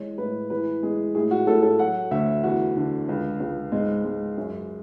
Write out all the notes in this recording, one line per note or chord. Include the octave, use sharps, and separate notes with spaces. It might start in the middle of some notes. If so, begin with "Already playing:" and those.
Already playing: E3 G#3 C#5
A2 B4
E3 B4
G#3 G#4
A2 G#4
F#4
A2 A4
A4
F#3 F#5
D2 E5
E2 F#4
D3
C#2
C#2
G#2 G#3
G#3
F#2